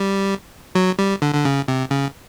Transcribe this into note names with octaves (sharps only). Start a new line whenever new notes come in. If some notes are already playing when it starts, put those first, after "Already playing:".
Already playing: G3
F#3
G3
D3
D3
C#3
C3
C#3